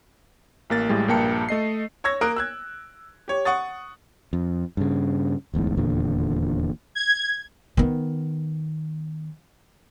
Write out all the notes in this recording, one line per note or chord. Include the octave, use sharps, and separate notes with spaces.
A1 A#3 A6
A1 A2 G3 G#3
A#1 G2 A#3 G5 A5 C#7
A3 D#5 C7
C#5 C#6 E6 G#6 A#6
A#3 A#4 D#6 F#6 D7
E6 F#6 G#6
G4 C#5
F#5 C#6 D#6 A6
F2
G2 C#3
D1 A1 E2 G#2
D#1 E2 A#2 D3
G#6
D#3 B3